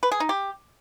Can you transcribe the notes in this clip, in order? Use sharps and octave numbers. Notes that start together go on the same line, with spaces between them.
B4
G#4
D#4
G4